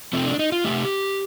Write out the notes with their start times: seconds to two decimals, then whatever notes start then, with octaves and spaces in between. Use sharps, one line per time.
0.13 C3 F3 A3 C4
0.26 D4
0.39 D#4
0.52 F4
0.65 F3 A3 G4
0.69 C3